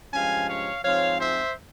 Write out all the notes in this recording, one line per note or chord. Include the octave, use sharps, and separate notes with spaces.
G2 F3 G#3 C#4 F5 G#5
C#5 F5
G#2 F3 C4 C#5 F5
C5 E5